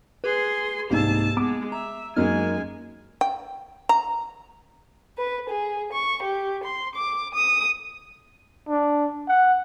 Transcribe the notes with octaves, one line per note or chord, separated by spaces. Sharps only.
G#4 B4 C6
C2 G#2 A#3 G#4 A5 E6
G#3 B3 D6
E5 A#5
F#2 G#3 A#3 D#4 G#5 F6
G5
A#5
B4
G#4
C#6
G4
C6
D6
D#6
D4
F#5